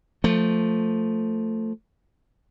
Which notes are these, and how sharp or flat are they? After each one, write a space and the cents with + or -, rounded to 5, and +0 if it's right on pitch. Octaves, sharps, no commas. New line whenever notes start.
F3 +10 A3 +15